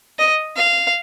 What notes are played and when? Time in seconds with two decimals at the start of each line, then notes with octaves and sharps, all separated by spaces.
0.19 D#5
0.56 F5